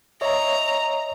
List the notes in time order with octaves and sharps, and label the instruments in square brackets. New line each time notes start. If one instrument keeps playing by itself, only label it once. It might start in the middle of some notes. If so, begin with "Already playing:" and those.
[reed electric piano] C#5 D#5 E5 [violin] A#5